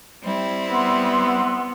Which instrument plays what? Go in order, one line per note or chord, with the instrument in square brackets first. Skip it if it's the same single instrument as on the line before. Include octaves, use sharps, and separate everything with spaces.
[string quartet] G3 C4 E4
[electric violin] B3 [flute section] F#5 C6 E6